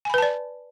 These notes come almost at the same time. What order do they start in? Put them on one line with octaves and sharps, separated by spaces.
G#5 B5 B4 A5 D5